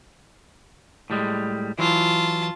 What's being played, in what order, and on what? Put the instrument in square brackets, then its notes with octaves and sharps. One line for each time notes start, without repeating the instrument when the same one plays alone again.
[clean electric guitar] A2 G3 G#3
[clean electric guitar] E3 F#3 [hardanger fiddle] F4 A5